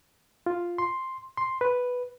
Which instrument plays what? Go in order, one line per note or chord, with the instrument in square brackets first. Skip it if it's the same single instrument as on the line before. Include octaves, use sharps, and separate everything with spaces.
[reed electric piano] F4
C6
C6
B4